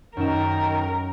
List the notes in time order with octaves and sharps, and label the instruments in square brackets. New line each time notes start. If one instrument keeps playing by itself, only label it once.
[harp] F#2 E7 [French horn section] D#3 [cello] A#4